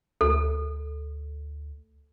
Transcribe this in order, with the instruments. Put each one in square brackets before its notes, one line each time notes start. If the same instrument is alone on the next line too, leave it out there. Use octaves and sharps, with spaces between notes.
[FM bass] D2 [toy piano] A4